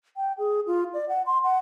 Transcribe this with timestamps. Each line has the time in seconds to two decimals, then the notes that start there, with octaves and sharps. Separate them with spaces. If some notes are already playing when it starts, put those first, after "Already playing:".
0.17 G5
0.39 G#4
0.67 F4
0.94 D5
1.09 F#5
1.26 C6
1.44 F#5